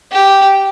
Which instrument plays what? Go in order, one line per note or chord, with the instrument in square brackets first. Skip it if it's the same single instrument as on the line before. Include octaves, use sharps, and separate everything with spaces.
[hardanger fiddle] G4